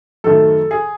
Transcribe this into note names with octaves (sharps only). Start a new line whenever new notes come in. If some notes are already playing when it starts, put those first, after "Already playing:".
F#2 D#3 A3 A4
G#4